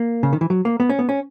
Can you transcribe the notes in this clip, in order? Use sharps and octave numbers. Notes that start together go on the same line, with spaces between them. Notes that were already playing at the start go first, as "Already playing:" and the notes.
Already playing: A#3
C#3
D#3
E3
F#3
A#3
B3
C#4
B3
C#4